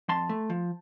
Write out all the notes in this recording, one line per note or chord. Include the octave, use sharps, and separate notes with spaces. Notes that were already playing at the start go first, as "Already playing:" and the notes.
F2 A5 C6
A3
F3